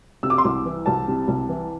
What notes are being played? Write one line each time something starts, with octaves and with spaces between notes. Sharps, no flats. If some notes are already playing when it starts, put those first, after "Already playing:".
C3 E6
D6
C6
C2 D6
E3
C2 A5
C3
C2
E3